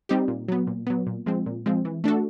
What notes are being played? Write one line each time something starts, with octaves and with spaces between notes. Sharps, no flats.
G3 C4 D#4 G4
A#2
F#3 B3
A#2
F#3 B3
A#2
F3 G#3 C4
A#2
F3 G#3 C4
E3
A3 D4 F#4 A4